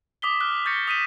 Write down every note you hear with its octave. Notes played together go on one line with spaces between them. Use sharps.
D6 D#6 B6 G7
F6 F#6 G7
C#6 G6 A6 A#6 C#7
D#6 B6 D#7 E7